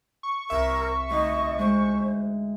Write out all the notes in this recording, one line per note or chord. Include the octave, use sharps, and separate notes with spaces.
C#6
C2 A#4 E5
D2 D#4 D#5
G#3 C5